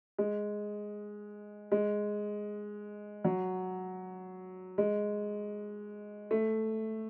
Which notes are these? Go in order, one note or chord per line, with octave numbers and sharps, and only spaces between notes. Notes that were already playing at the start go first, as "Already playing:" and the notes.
G#3
G#3
F#3
G#3
A3